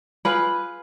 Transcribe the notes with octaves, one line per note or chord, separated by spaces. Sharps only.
F4 G#4 B4 B5